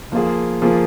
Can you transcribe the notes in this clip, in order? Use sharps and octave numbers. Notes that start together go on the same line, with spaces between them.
F3 A#3 F4 G#4
F3 A#3 F4 G#4